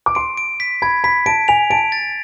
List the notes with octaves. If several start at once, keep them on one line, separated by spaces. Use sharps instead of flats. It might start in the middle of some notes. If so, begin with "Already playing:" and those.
D6
C6 D7
D7
B6
B5 G#6
B5 B6
A5 D7
G#5 F7
A5 D7
A6